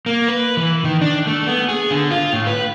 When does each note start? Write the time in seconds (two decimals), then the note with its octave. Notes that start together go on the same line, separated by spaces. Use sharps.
0.06 A#3
0.28 B4
0.57 E3
0.84 D#3
1.01 D4
1.27 A3
1.47 B3
1.69 G#4
1.90 D3
2.11 F4
2.33 A2
2.47 B4